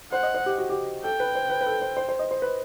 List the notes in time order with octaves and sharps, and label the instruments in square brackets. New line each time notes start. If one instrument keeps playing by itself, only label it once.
[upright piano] C5 [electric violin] F#5
[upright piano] D#5
C5
G4
F#4
G4
[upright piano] A4 [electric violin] G5
[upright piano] B4
C5
B4
B4
A4
C5
C5
C5
D#5
C5
B4